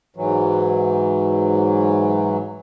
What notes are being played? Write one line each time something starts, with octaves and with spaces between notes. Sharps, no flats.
G#2 E3 F#3